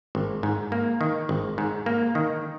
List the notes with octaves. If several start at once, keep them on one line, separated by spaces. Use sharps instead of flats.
G#1
G#2
A#3
D#3
G#1
G#2
A#3
D#3